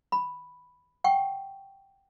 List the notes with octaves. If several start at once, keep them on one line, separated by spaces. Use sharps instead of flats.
B5
F#5 G5 C#6